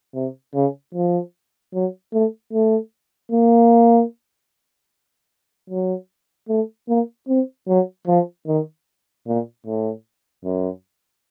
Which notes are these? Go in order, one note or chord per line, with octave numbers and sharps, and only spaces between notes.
C3
C#3
F3
F#3
A3
A3
A#3
F#3
A3
A#3
C4
F#3
F3
D#3
A#2
A2
F#2